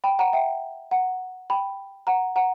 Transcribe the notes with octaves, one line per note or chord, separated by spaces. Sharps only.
G5 B5
F#5 A#5
E5 G5
F#5 A#5
G5 B5
F#5 A#5
F#5 A#5